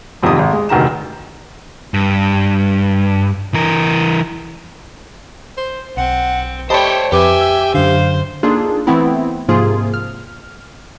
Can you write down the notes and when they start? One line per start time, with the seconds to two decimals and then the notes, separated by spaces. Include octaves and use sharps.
0.23 G#1 F2 C3 D#3 D#6
0.39 G#1
0.53 G#3
0.69 F1 D2 D#3 A#5 E7
1.94 G2
3.54 E3 A#4
5.57 C5
5.97 B1 C4 F#5
6.70 A3 G4 C5 C#5 D#5 G5 A5 B5
7.12 F2 G4 B4 E5 G5 G#5 D6
7.41 E6
7.74 F#2 D3 C5 F5
8.43 A#3 D4 D#4 F4 G#4 A4
8.87 E3 A3 B3 C4 E4
9.48 G#2 C3 F3 A#3 F4 G#4
9.94 F6